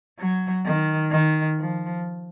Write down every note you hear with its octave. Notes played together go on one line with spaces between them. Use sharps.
F#3
D#3
D#3
F3